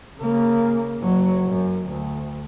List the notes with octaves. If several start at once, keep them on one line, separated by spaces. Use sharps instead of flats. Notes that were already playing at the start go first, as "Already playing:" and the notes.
C#3 A#3
F#1 F#3
F#2
D2